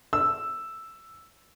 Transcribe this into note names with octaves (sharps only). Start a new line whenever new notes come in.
E6